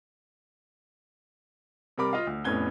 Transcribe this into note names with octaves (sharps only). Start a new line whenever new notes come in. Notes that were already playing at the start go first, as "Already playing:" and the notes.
C3 G3 A#4 B5 D6
F4 D#5 F5
D2
F1 A2 B3 C#4 G#6 G7